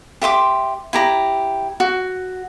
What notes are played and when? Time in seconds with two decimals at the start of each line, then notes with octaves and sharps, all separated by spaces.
0.22 G4 E5 C6 D6
0.93 E4 G4 A#5
1.80 F#4